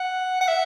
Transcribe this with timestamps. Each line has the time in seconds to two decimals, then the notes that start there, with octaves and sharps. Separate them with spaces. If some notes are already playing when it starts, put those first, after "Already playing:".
Already playing: F#5
0.41 F#5
0.48 E5